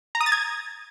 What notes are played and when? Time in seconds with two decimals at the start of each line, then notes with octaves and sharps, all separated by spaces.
0.15 A#5
0.21 D#6
0.26 A6
0.32 G#6